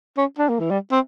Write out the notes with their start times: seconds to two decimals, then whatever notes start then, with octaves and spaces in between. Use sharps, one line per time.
0.18 C#4
0.39 D4
0.49 A#3
0.60 E3
0.71 G3
0.92 C4